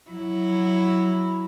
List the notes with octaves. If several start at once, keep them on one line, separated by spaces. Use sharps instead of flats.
F#3 E4